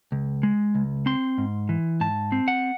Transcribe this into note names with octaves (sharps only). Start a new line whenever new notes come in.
C#2
G#3
C#2
C4 C6
G#2
E3
G#2 A5
C4
F#5